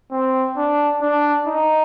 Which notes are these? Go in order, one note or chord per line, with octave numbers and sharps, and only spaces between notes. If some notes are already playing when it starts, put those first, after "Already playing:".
C4
D4
D4
D#4